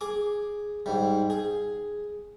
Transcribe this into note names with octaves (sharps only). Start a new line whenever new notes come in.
G#4 D6
G#2 G3
G#4